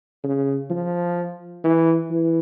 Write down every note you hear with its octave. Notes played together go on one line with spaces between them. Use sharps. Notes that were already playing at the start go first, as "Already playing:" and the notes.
C#3
F3
E3
E3